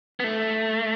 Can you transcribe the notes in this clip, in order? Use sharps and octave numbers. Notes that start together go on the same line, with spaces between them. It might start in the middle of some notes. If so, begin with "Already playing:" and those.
B3
A3